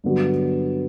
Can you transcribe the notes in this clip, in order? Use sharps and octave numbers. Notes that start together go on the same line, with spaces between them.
G2 D3 F#3 B3 F#4